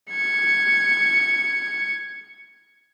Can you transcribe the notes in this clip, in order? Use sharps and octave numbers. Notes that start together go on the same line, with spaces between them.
G#6 C#7